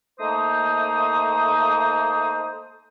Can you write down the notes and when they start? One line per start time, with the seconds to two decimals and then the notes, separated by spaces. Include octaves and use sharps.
0.20 A3 A#3 D#4 C5 D#6